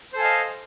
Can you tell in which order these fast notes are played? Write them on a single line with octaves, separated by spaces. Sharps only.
C5 A4 G#5 F5 D#5